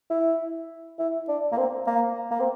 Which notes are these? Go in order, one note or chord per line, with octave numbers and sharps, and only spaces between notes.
E4
E4
D4
A#3
C4
A#3
A#3
C4